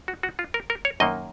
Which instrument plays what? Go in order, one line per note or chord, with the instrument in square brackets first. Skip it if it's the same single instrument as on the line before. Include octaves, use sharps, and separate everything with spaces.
[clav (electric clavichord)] F#4
F#4
F4
A#4
A#4
C#5
F#2 D#3 A#3 D#5